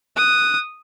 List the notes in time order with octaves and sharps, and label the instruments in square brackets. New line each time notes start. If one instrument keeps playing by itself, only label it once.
[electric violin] D#6 [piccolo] F#6